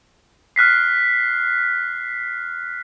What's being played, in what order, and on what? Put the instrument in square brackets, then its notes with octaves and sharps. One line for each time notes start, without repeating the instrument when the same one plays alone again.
[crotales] F6 F#6 B6 C7